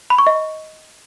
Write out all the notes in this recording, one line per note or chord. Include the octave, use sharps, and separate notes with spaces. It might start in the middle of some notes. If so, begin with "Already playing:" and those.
B5
C#6
D#5